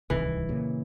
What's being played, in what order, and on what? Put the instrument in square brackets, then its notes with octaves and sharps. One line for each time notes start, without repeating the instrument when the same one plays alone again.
[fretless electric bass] D1 C2 D#3 [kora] E3
[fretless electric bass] A#2 C#3